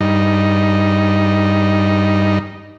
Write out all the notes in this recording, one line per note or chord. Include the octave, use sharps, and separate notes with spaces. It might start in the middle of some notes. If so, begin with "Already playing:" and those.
G2 D#4